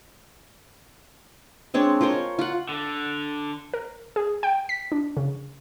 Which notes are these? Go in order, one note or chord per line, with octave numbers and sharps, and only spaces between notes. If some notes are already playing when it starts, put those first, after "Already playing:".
G#3 C4 D4 C#5
F4 A#4 C5 C#5
F4 F#5
D3
A#4
G#4
G5
B6
D4
C#3